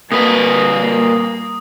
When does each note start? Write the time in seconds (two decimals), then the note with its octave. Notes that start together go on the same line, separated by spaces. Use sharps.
0.12 A#2 G3 A#3 B4 D#6